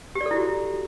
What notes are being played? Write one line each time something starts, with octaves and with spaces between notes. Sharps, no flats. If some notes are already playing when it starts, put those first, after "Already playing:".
G4
D5
A4
E4
F#4